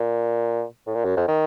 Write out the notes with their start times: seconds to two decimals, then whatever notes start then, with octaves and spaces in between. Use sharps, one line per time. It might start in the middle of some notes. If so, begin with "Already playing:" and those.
Already playing: A#2
0.87 A2
0.95 A#2
1.05 F#2
1.17 F2
1.28 D#3